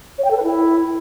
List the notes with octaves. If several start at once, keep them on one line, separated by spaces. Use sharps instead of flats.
C#5
G5
A4
B4
E4